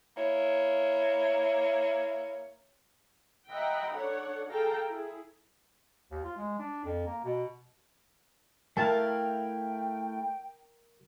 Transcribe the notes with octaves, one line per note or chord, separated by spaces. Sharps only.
A#3 E4 C#5
D#5 E5 F#5 G5 A#5 B5
D4 A4 C#5 F#5
G#4 A4 F5 G5 A5 A#5
E4 G#4
D#2
F4
G#3
D4
F2
A#3
B2
A3 E4 A#4 F5 G5 A5